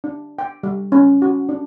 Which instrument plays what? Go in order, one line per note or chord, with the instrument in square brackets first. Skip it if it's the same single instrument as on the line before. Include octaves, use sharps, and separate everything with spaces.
[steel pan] D4
G5
G3
C#4
F#4
D4